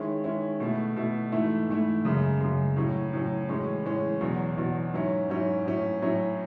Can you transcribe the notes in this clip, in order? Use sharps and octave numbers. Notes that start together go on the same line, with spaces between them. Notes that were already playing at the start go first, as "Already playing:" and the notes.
Already playing: D#3 G#3 C#4 E4
D#3 G#3 C#4 E4
B2 A3 E4
B2 A3 E4
G#2 E3 A3 E4
G#2 E3 A3 E4
F#2 C#3 G#3
F#2 C#3 G#3
A2 F#3 C#4
A2 F#3 C#4
A2 E3 G#3 C#4
A2 E3 G#3 C#4
E2 B2 F#3
E2 B2 F#3
G#2 F#3 C#4 E4
G#2 F#3 C#4 E4
A2 F#3 C#4 E4
A2 F#3 C#4 E4